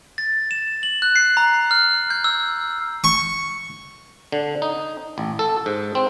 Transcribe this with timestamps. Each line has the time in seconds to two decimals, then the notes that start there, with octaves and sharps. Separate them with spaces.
0.18 A6
0.51 E7
0.83 F#7
1.02 F#6
1.16 C7
1.37 A#5
1.71 F6
2.10 G6
2.24 E6
3.04 C#6
4.32 D3
4.62 D#4
5.18 A1
5.39 A4
5.66 G#2
5.95 C4